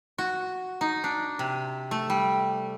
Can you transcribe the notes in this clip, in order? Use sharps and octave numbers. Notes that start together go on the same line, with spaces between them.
F#4
D#4
D4
C3
A3
G3